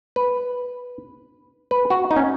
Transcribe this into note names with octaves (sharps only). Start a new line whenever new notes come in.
B4
B4
F#4
D#4
C#4